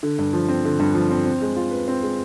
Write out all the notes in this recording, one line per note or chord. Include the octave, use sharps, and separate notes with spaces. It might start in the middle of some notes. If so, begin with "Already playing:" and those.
D3
G2
F3
C4
D3
G2
F3
C4
C4
G#3
F4
B4
C4
G#3